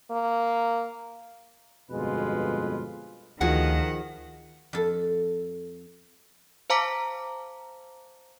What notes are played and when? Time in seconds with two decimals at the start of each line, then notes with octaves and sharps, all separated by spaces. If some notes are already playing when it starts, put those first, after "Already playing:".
0.11 A#3
1.90 G1 F2 B2 G#3 F4 B4
3.41 D2 D#3 F3 F#4 G#4 F#5
4.73 F2 A4
6.70 C5 F5 A5 A#5 D6 B6